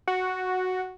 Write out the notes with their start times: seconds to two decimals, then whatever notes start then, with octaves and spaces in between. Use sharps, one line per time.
0.07 F#4